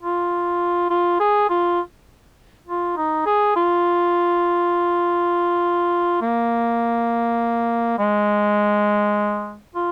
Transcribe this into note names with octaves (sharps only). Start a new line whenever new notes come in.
F4
F4
G#4
F4
F4
D#4
G#4
F4
A#3
G#3
F4